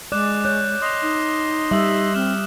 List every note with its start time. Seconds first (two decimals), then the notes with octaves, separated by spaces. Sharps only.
0.12 G#3 D5 D6 F#6 E7
0.45 C#5 F#6 G6
0.82 D#5 C6 D#6 F7
1.02 D#4
1.71 G3 E5 D#6 F#7
2.15 C4 F6 E7